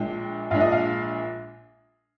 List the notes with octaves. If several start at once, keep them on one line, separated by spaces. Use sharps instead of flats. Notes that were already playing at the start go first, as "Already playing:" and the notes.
Already playing: A#1 A#2 G#3 D4 G5
A#1 A#2 G#3 D4 F5
D#5
F5